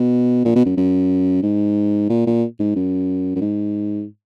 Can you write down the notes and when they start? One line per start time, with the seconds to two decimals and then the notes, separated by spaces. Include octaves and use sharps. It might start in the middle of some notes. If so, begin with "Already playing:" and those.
Already playing: B2
0.45 A#2
0.56 B2
0.66 F#2
0.77 F#2
1.43 G#2
2.10 A#2
2.27 A#2
2.60 G#2
2.76 F#2
3.35 F#2
3.41 G#2